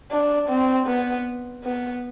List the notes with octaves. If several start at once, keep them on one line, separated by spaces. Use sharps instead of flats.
D4
C4
B3
B3